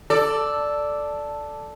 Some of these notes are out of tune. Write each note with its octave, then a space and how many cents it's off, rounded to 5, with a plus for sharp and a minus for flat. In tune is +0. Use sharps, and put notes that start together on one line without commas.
A4 +0 D5 +0